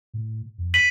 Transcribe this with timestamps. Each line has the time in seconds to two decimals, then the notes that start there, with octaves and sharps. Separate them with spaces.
0.14 A2
0.58 F2
0.74 B6 D#7 F#7